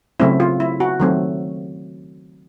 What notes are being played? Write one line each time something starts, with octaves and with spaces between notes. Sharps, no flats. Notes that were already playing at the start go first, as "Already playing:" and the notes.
C#3 F#3 A3 C4 E4
F4
E4
F#4
D#3 F#3 A3 C4